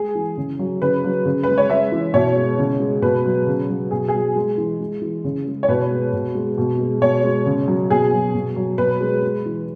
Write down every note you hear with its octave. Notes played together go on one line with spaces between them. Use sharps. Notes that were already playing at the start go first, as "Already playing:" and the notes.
Already playing: G#3 G#4
E3
C#3
F#3
C#3 B4
F#3
C#3
G#3 B4
C#5
G#3 E5
E3
B2 C#5
G#3
C#3
G#3
B2 B4
F#3
C#3
F#3
B2 G#4
G#4
F#3
G#3
E3
G#3
E3
C#3
G#3
C#5
B2 B4
G#3
B2
G#3
B2
G#3
B2 C#5
G#3
C#3
F#3
B2 G#4
F#3
B2
F#3
B2 B4
G#3
G#3
E3